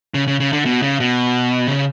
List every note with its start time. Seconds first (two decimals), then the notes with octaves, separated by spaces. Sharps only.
0.14 C#3
0.28 C#3
0.40 C#3
0.53 D3
0.66 B2
0.82 C#3
1.00 B2
1.67 C#3